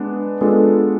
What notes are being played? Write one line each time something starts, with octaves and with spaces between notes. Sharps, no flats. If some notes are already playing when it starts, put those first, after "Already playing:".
Already playing: G#3 B3 D4
G#3 B3 D4 F4 A4